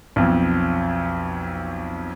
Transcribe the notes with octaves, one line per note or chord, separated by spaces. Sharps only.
B1 F2